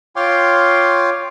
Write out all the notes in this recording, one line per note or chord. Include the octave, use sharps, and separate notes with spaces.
F4 C#5 F5 G5 C6 D6